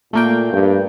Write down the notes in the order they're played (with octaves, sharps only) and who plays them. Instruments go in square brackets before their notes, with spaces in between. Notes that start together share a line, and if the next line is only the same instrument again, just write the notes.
[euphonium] A#2 [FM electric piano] A3 A#3 G5
[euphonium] G2